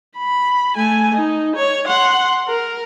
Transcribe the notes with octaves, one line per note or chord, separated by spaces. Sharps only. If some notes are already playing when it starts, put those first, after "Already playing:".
B5
A3 G#5
D#4
C#5
F#5 C6
A#4